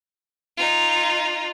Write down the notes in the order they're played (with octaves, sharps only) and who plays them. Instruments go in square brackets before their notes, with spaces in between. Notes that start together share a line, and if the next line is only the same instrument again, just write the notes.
[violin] D#4 F4